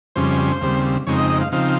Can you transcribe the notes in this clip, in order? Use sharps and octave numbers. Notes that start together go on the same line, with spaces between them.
F2 C#3 G3 C#4 C5
D#2 C#3 G3 C4
F2 C#3 G#3 C4 D#4 C#5
D#5
D#5
F5
C#3 F3 C4 D#4 F5